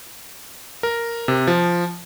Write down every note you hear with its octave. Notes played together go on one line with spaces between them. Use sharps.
A#4
C3
F3